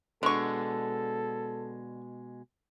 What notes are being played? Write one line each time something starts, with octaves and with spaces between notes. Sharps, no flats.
B2 D3 G#3 A4 C#6